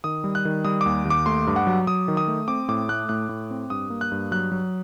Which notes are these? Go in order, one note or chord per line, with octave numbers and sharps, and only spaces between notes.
D#3 D#6
G3
F#6
D#3
G3 D#6
D#2 D6
D#2
D6
A3 C6
G2
F#5
F#3
F#3 D#6
D#3
D#6
A3
C4 D6
A2 D6
A3 F#6
A2 F#6
A2
C4
G2 D#6
A#3
F#6
G2
F#3 F#6
F#3